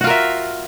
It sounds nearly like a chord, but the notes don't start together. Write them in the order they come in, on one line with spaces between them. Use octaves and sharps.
F#4 F4 A#4 E5